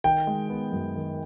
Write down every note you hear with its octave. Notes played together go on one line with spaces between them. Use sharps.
D#3 G5
G#3
B3
F#2
D#3